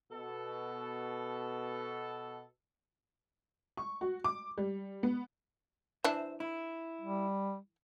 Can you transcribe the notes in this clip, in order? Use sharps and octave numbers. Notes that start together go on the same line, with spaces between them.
B2 A4
C#6
F#4
D6
G3
B3
E3 D4 C5 E5
E4
G3